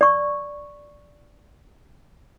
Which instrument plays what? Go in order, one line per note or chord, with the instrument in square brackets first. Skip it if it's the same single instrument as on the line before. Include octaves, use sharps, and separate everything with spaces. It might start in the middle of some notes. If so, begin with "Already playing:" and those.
[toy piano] D5 C#6